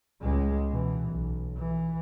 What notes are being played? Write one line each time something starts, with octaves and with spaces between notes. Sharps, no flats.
C#2 G#3
B2 E3
B1
E3